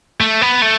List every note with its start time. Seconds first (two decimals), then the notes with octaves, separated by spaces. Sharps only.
0.21 A3
0.42 B3
0.62 A3